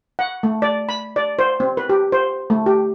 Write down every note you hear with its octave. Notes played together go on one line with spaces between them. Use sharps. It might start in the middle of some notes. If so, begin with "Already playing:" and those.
F#5
A3
D5
B5
D5
C5
C4
B4
G4
C5
A3
G4